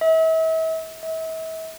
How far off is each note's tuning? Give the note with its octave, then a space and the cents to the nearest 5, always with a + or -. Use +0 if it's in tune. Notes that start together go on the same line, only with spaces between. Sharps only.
E5 -40
E5 -40